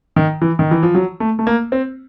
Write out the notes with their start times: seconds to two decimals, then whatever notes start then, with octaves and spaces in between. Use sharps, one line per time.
0.16 D#3
0.41 E3
0.59 D#3
0.71 E3
0.83 F3
0.95 F#3
1.20 A3
1.39 A3
1.47 A#3
1.72 C4